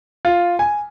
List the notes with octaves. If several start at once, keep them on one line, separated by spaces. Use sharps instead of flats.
F4
G#5